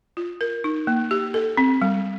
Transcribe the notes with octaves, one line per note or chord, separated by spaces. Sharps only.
F4
A#4
D#4
A#3
G4
A4
C4
G3